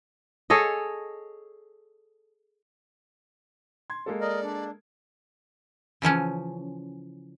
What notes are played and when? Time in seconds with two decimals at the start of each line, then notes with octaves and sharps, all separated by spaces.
0.50 G#4 A4 C#5 D#5
3.90 C6 G#6
4.06 G#3 A#3 A4
4.21 A#4 D5 D#5
4.43 D4
6.02 C#3 E3 F3 C#4